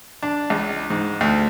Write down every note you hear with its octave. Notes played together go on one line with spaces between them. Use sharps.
D4
C#2
G#2
D2